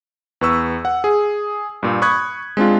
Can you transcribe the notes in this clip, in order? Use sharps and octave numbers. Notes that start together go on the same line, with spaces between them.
E2 B4 C#6 E6
F#5
G#4
G2 A#2
B5 C#6 D#6 F#6 G#6
G#3 C4 D4 F4